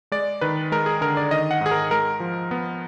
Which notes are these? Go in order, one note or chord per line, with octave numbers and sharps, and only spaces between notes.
G#3 D5
D#3 B4
G#3 A#4
G#4
D3 A#4
D5
D#3 D#5
F#5
G#2 G#4
A#4
G#3 A#4
F3
B3